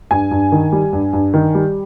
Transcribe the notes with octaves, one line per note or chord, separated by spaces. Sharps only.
G2 G#5
G2
D#3
G3
G2
G2
D#3
G3